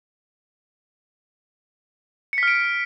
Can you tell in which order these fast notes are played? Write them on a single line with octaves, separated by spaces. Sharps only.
C#7 B6 F6 D7